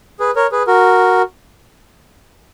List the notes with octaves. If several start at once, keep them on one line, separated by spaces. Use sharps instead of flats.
G#4 B4
A#4 C#5
G#4 B4
F#4 A#4